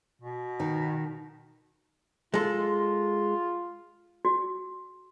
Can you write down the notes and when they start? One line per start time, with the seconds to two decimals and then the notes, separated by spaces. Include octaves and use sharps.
0.22 B2
0.60 D#3
2.34 G#3 F4 A4
4.25 F#4